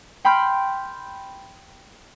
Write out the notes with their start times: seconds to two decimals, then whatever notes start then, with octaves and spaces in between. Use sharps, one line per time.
0.25 G5 B5 C6 F6 G6